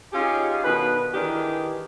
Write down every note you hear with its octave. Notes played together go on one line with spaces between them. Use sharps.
C#4 D#4 F4 G4 G#4
B2 D3 D#3 B4
D#3 E3 D4 G4 G#4